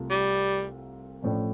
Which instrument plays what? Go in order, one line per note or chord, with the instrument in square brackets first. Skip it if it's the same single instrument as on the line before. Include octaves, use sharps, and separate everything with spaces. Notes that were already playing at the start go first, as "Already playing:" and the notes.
Already playing: [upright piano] C2 C3 A3 F4 A4
[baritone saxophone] G3
[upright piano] A1 A2 F3 A3 D4